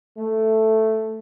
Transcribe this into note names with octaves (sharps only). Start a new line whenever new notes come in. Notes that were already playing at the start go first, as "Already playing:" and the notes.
A3